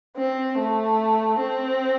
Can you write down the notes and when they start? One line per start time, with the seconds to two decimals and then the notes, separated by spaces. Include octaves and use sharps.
0.17 C4
0.58 A3
1.40 C4